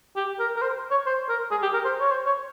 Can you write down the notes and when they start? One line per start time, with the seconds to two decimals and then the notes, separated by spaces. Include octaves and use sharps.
0.16 G4
0.39 A#4
0.56 A#4
0.62 C5
0.91 C#5
1.06 C5
1.29 A#4
1.51 G#4
1.62 G4
1.73 A#4
1.85 C5
2.00 C#5
2.11 C5
2.26 C#5